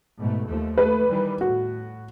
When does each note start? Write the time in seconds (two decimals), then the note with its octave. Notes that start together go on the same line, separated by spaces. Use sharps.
0.18 G#2 B2 A3
0.47 D#2 F3 A3
0.78 A3 B4
1.08 D#3 E3 G3
1.41 A2 F#4